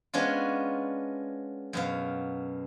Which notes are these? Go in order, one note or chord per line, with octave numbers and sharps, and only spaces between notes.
G#3 B3 C#4 D4 F4
F#2 B2 F5